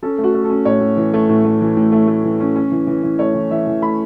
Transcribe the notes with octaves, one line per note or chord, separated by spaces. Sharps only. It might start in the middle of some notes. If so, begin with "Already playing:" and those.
C#4 A4
A3
F#4
A3
A4
C#4
A2 C#5
A2
E3
A3
A2
A3
E3
A2
A3
A3
E3
C#4
C#4
E3
E3
E3
A3 C#5
E3
E3 E5
E3
A3 B5